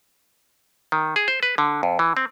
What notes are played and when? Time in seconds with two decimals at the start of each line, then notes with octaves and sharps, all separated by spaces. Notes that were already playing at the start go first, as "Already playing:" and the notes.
0.92 D#3
1.16 G#4
1.28 C5
1.43 B4
1.58 D3
1.83 F2
1.99 E3
2.17 C4